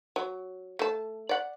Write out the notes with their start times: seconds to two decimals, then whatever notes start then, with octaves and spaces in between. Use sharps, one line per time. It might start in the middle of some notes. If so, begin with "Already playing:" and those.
0.16 F#3
0.79 A3 A5
1.29 D5 F#5